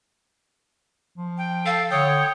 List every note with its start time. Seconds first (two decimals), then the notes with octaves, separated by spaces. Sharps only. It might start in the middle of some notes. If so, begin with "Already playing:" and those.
1.18 F3
1.38 G5
1.66 A4 F5
1.91 D3 C#5 G5 D#6